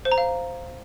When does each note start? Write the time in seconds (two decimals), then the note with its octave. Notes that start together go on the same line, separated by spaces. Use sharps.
0.05 C5
0.11 A#5
0.18 F5